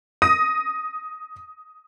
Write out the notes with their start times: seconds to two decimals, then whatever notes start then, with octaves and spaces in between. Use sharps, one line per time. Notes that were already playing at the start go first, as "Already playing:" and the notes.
0.22 D#6 A#6 D#7